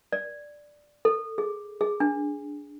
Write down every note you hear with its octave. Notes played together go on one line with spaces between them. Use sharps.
D5
A4
G#4
G#4
D4